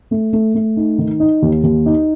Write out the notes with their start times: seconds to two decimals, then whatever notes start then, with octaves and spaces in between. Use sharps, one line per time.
0.11 A3
0.33 A3
0.55 A3
0.77 D#4
0.98 D#3
1.20 D#4
1.42 D#2
1.63 D#2
1.86 D#4